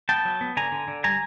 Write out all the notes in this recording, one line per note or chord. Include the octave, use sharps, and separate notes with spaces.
B3 G5 A5
F#3
B3
D3 G#5 A#5
D3
D3
G3 G#5 A#5